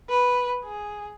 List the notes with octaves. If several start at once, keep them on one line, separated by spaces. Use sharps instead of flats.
B4
G#4